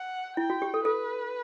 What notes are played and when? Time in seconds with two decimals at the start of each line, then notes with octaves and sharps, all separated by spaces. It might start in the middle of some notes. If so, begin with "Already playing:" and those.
Already playing: F#5
0.37 E4 G5
0.50 F#4
0.62 G4
0.74 A4
0.85 A4 B4